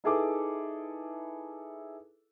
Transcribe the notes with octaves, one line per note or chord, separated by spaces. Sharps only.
D#4 E4 G#4 A4 B4 D6